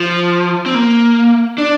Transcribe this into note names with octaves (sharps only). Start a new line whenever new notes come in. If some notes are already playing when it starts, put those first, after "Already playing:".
Already playing: F3
C4
A#3
D4